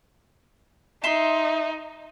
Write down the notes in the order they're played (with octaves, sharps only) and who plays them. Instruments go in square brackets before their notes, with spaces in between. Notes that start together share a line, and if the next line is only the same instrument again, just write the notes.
[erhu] D#4 [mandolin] E5 C6